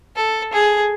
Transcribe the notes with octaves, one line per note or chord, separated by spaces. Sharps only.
A4
G#4